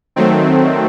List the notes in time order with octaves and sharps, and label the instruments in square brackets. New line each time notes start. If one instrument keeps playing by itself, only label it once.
[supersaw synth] D#3 F#3 A3 C4